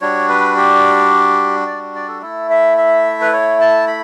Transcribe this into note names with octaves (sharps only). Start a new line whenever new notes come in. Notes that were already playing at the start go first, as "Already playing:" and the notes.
G3 D4 F#4 C#5
B4
G4
D5
D5
A4
A3 E4 A4
E5
E5
B4
C#5
A5
B5